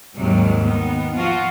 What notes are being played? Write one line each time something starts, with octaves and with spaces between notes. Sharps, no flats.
D#2 G#2 C3 F#3 G3
D#3 B3
F3 F4 F#4